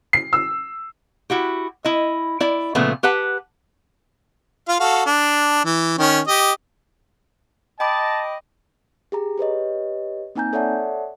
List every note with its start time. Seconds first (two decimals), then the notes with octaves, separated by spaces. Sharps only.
0.13 C7
0.33 E6
1.30 E4 F#4 G4
1.85 E4 D#5
2.40 E4 D5
2.75 A#2 C#3 F3 A3 B3
3.03 G4 B4 F#5 A5
4.68 F4 F5
4.80 F#4 A4 F5
5.06 D4
5.65 E3
5.99 D#3 C#4
6.28 G4 D#5
7.80 D#5 G5 A5 B5 D6
9.12 G4 G#4 A#5
9.38 G4 B4 C#5 D#5
10.35 A#3 C4 D#4 G#5 A#5 G6
10.53 A4 C#5 D5 E5 F#5 A5